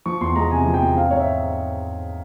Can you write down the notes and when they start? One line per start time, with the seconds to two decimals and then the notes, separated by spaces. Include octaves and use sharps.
0.06 F3 C#6
0.21 E2 C6
0.36 G#3 A#5
0.51 C3 G#5
0.66 F3
0.74 G5
0.82 E2
0.97 C4 F5
1.11 G#2 C#5
1.19 E5